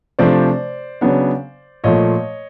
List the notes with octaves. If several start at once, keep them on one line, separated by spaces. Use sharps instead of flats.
C3 F3 A3 D4 C5 D5
C#3 F#3 B3 D4
A#2 F3 A3 C#5 D#5